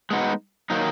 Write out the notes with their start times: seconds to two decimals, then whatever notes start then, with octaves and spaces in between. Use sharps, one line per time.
0.11 G#3 B3 D#4 F#4
0.70 D#3 F#3 A#3 D#4